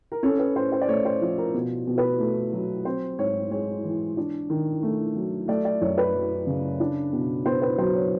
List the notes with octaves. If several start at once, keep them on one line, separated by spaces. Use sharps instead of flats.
A#4
C#4 A4
B4
A2 C5
C5
D5
A3 C#5
C5
F3
A#4
B2
B2
B4
A3
F#3
C4 C5
G#2 C#5
G#3 C#5
E3
D4
D#3
A3
F#3
A3 D5
D5
F#2 C#5
B4
F#3
C#3
D4
B2
B3 C5
B4
F#3 C5
C#5